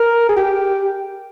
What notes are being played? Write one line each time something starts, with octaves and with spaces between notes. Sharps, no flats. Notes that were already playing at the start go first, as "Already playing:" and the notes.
Already playing: A#4
G#4
G4